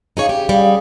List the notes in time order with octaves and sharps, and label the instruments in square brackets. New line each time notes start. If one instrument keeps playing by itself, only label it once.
[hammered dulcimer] C#3 D5 [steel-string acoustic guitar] D#4 G#4 C#5
[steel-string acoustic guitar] G4
[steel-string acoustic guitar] G3 [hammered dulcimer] G#4 F5